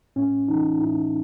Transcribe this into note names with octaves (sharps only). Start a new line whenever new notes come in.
A2 C#4
E3 D#4
A2 E4